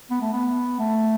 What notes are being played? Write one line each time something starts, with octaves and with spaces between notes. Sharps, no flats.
B3
A3
B3
A3